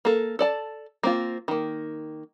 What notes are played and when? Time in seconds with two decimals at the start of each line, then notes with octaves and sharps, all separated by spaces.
0.05 A#3 A4
0.39 A4 D5 A5
1.03 A#3 C4 F4
1.48 D#3 A#3